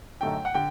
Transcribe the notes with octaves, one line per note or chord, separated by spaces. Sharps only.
F#2 D3 A3 D#4 G5
F#5
D3 G5